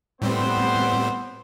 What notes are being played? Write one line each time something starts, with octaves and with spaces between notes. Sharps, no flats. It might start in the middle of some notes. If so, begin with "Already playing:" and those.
A2 G3 B3 C4 C5